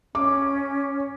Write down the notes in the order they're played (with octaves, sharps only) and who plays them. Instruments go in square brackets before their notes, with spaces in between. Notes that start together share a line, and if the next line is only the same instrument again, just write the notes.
[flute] C#4 [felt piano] D6